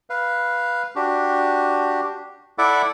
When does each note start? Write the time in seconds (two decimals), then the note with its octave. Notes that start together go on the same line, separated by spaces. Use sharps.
0.10 B4 F5
0.96 D4 F#4 G4
2.58 E4 A4 D5 E5 F#5 D6